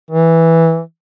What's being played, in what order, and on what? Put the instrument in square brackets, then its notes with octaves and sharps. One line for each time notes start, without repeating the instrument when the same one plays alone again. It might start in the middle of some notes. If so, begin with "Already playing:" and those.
[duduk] E3